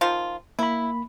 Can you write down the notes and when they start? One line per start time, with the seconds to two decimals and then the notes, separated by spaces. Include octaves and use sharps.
0.01 D#3 F3 F4
0.59 A#3 E4 B5